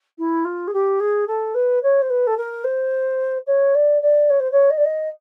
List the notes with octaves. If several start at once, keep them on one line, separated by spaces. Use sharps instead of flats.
E4
F4
G#4
G4
G#4
A4
B4
C#5
C5
B4
A4
A#4
C5
C#5
D5
D5
C#5
C5
C#5
D#5
D5
D#5